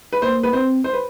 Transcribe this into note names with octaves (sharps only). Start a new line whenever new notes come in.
B4
A#3 C5
B4
C4 C5
C5
B4